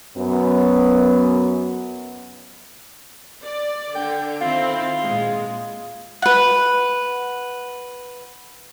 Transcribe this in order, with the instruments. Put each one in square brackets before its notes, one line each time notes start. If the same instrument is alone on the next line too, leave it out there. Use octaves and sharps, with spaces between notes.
[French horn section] F#2 B3
[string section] D5
[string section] D3 [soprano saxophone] G5
[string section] D#3 C4 E4 [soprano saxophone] F4
[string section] A#2 G#3
[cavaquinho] B4 F#5